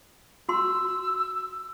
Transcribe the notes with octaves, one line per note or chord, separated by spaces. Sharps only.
F#4 C6 E6